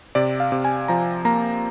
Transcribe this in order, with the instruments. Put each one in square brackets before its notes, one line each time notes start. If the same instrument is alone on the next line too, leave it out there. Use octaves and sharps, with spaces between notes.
[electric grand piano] C3 D5
F5
C3
G#5
F3 A#5
A#3 A#5